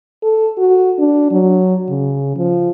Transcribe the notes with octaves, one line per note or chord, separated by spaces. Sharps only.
A4
F#4
D4
F#3
C#3
F3